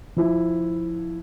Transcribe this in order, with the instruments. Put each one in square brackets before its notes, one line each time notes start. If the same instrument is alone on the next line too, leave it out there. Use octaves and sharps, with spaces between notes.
[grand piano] F3 E4